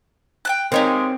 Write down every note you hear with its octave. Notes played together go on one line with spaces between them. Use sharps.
G5 A5 F#6
D#3 G#3 C4 D#4 G4 C#5 F5